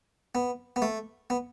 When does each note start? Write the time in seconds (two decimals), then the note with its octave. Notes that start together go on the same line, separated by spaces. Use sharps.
0.35 B3
0.76 B3
0.82 A3
1.30 B3